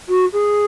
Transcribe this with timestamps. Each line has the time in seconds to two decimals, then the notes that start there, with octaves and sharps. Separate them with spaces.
0.08 F#4
0.32 G#4